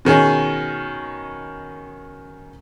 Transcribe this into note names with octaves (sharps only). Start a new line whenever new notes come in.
B2 D#3 C#4 G#4